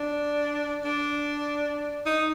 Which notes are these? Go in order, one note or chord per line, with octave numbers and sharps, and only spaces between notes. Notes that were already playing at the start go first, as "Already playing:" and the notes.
Already playing: D4
D4
D#4